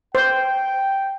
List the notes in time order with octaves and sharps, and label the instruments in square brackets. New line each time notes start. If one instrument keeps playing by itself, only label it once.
[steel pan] C5 [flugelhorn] G5